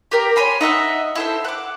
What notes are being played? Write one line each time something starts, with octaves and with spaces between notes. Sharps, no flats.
G4 A#4 G5
C#5 G#5 B5 C6
D#4 D#5 E5 F#5
E4 A4 C5
F#5 D6